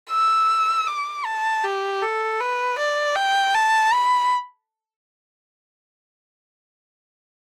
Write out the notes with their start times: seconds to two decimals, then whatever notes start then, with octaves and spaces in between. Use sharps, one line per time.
0.10 E6
0.87 D6
1.25 A5
1.64 G4
2.03 A4
2.40 B4
2.78 D5
3.16 G5
3.55 A5
3.93 B5